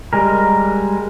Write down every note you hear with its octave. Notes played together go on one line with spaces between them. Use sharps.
G3 G#3 A#4